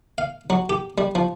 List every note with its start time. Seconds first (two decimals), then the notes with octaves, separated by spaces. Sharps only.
0.18 F5
0.50 F#3
0.69 G4
0.98 G3
1.15 F3